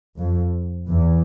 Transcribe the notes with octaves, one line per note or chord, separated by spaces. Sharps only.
F2
E2